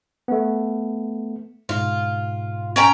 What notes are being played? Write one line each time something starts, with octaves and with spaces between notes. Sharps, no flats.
A3 B3
G#2 B2 F4
C#4 G5 A#5